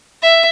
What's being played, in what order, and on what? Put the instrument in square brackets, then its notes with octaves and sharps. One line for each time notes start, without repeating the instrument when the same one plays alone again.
[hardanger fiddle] E5